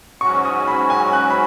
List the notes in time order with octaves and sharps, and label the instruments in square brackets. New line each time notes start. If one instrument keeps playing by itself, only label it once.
[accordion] G#2 F#3 C#4 F#4 [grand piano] C#6
[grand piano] D#6
B5
G#5
F#6
B5